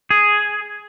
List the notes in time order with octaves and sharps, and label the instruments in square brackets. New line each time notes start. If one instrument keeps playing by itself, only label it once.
[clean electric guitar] G#4